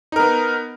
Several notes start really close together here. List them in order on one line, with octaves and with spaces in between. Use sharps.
D#4 A#4 B3